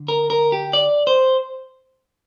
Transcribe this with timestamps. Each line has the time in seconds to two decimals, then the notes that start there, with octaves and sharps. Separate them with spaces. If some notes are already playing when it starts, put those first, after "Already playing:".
Already playing: D3
0.08 A#4
0.30 A#4
0.52 G4
0.73 D5
1.07 C5